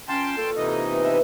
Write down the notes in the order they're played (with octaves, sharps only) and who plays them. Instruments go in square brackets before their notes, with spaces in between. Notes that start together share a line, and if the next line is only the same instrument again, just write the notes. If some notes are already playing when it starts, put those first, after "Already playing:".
[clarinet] C#4 [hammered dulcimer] F4 [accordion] G5 A5 C6
[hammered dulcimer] A#2 C#6 [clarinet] A4
[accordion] C3 E3 D#4
[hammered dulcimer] B3
[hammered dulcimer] B2 B4 [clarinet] E5